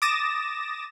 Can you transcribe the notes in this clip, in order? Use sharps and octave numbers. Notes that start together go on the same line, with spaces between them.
D6 D#6 A6 A#6 E7